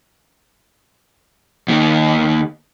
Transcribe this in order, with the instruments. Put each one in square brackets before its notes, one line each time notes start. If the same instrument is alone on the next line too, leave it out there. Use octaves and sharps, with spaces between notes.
[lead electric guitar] D#2 D#3